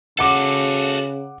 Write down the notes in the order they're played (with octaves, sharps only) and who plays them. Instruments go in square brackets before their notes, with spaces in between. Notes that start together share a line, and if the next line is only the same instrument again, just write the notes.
[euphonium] C#3 [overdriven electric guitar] F#4 A4 [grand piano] F#5 D6